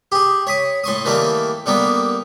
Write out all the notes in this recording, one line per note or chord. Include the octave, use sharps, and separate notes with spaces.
G4 G#4
C#5 B5 D#6
A2 C6 C#6 D#6
D#3 E3 G3 A3 A#3
D3 G3 A#3 B3